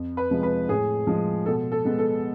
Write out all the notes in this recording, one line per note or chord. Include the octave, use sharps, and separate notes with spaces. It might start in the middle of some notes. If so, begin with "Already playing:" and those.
Already playing: F2
B4
C3 F3 G#3
B4
A2 G#4
F3 G#3
B2 A4
A4
G#3 B3
A4